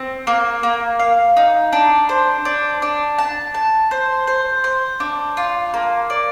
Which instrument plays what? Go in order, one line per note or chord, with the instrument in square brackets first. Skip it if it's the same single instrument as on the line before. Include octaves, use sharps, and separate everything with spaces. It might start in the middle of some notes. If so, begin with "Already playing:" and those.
Already playing: [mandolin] C4
A#3
A#3
F5
D#4
D4
C5
D4
D4
A5
A5
C5
C5
C5
D4
F4
A#3
D5